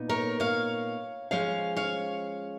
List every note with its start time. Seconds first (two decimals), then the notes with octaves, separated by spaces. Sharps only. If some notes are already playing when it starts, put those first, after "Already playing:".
Already playing: A#2 B3 D#4
0.09 A#4 C#5
0.40 C#5 F5
1.31 F3 G#3 C#4 C#5 F5
1.76 C#5 F5